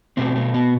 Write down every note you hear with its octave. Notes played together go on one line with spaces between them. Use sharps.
B2 A3 C4
A3
B3